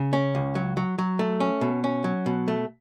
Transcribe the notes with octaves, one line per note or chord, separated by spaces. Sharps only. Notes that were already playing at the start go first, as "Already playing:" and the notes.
Already playing: C#3
C#4
C#2
F#3
F#3
F#3
A3
C#4
B2
C#4
F#3
B2
A3